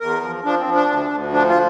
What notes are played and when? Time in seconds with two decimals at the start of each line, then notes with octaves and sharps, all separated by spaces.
0.01 E2 A#4
0.22 F3
0.44 F3 D4
0.59 C4
0.66 F3
0.75 D4
0.89 D2
1.11 D2
1.33 F3 D4
1.48 F4